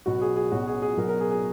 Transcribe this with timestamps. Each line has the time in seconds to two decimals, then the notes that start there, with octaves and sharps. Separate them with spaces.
0.06 B1 B2 F#3 F#4
0.21 G#4
0.36 G#4
0.52 B1 B2 F#3 F#4
0.67 G#4
0.82 G#4
0.97 B1 B2 F#3 A#4
1.09 A#4
1.20 G#4
1.31 G#4